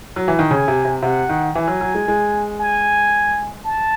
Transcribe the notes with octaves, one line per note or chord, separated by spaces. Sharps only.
F#3
E3
D#3
C#3 G#5
C3
C3
C3 F#5
D#3
E3 G#5
F#3
F#3
G#3
G#3
G#5
A5